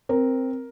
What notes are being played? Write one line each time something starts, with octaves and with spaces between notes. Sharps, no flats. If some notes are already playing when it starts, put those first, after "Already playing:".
C4 A#4